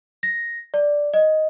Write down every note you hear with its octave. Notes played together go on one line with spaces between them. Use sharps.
A#6
D5
D#5